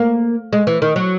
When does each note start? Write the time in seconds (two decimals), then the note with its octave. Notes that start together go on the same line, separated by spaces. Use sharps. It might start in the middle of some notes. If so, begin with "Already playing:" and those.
Already playing: A#3
0.53 G#3
0.67 E3
0.82 D#3
0.96 F#3